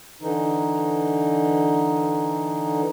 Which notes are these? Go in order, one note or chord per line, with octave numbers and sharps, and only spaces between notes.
D3 E3 D#4